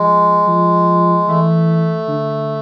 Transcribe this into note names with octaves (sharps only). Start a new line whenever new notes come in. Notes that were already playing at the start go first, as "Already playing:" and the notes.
Already playing: F3 G#3
F3
E3 A3
D3